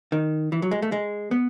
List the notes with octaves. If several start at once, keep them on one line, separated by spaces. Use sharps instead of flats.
D#3
E3
F#3
G#3
A3
G#3
B3